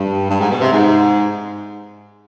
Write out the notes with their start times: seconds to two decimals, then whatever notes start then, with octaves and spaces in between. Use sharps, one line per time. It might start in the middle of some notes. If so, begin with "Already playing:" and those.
Already playing: G2
0.30 G2
0.40 G#2
0.50 B2
0.62 C3
0.73 G#2